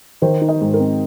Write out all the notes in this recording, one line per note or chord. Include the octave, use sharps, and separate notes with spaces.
D#3 C5
D#4
D#5
G#2
A#4
C4